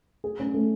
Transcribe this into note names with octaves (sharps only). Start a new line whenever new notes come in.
G#4
C#4
A3